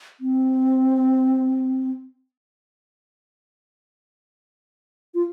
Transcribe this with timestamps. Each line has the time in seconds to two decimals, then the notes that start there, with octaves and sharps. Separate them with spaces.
0.20 C4
5.14 F4